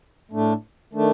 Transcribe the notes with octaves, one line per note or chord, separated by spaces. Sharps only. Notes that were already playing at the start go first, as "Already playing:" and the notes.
A2 A3 D4
D#3 A3 D4